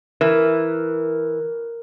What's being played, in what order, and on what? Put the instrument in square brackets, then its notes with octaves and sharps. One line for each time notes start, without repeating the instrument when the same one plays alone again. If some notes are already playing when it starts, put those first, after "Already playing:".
[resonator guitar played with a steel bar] E3 [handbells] A#4